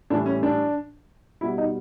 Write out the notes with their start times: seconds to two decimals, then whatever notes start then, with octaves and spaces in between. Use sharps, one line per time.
0.10 A2 E3 G3 D4
0.26 C#4
0.43 D4
1.41 B2 G3 E4
1.58 D#4